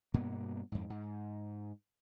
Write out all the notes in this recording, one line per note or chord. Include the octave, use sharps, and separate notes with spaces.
G2 B2 A#3 B3
F2 G#2
G#2